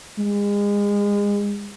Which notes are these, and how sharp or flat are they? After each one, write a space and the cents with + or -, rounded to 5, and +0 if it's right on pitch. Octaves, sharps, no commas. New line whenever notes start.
G#3 -30